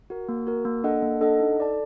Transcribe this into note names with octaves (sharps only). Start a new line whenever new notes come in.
F#4 A#4
A#3
F#4 A#4
A#3
D4 A4 D#5 F#5
A#3
D4 A4 D#5 F#5
D#4
A4 D5 A5